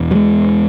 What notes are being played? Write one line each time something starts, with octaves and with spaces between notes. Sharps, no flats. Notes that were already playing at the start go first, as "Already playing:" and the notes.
Already playing: E2 B2
F#3
G#3